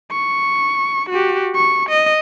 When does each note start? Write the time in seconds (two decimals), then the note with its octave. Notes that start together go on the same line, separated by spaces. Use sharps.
0.12 C#6
1.10 F#4 G4
1.56 C#6
1.89 D#5